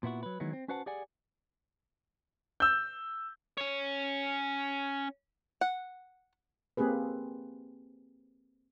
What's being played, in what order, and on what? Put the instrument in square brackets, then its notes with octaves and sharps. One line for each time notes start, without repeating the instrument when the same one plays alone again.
[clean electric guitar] A#2 B3 E4 F#4
F#3 B4
D#3 E3 F#3 G#3 B3
C4
C#4 F#4 B4 C5 F#5 A5
G4 G#4 D5 F#5 G#5
[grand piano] E6 G6
[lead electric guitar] C#4 C#5
[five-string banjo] F#5
[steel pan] A#3 C4 G4 G#4 B4